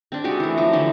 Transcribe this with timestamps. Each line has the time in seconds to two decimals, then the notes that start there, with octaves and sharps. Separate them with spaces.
0.12 C4 D4
0.24 G#3 C4 F#4 G4
0.40 E3 A3
0.58 F3 F#3 A#5
0.73 D3 E3 F3 G4